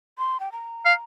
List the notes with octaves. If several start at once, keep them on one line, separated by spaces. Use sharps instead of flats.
C6
G5
A#5
F5